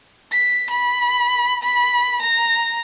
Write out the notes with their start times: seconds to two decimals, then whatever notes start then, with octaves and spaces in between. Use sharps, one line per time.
0.32 B6
0.71 B5
1.63 B5
2.22 A#5